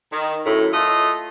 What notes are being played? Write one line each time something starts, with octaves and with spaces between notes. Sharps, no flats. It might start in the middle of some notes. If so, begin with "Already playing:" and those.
D#3
F#2 A2
A3 F4 D#5